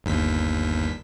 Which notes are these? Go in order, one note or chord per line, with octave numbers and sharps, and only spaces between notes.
G1 D#2 B6